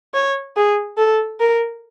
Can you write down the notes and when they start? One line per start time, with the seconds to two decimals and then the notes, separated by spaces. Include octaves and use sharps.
0.14 C#5
0.56 G#4
0.98 A4
1.40 A#4